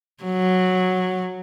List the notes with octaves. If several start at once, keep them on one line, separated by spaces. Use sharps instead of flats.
F#3